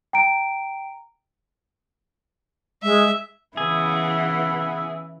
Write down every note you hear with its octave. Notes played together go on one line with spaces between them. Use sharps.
G5 A#5 D7
G#3 E5
C#3 E3 B3 E4 G#4 E5